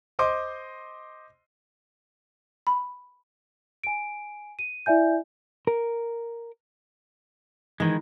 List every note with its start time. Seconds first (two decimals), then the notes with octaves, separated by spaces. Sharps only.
0.19 C5 D#5 C6 D6
2.67 B5
3.84 G#5 D7
4.59 D#7
4.86 E4 D5 E5 G#5 G6
5.67 A#4
7.80 D#3 E3 G#3